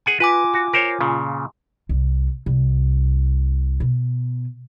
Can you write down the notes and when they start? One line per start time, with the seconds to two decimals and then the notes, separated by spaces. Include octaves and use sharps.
0.06 G#4 F#5 G#5
0.20 F4 B4 G#5 D6
0.54 F#4
0.73 A#4 C5 C#5
1.01 A#2 C#3
1.89 C2
2.46 C2
3.80 B2